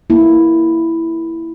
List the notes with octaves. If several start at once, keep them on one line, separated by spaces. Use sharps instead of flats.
A#3 E4